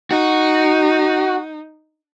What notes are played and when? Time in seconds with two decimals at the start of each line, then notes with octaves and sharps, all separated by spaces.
0.11 D#4 F#4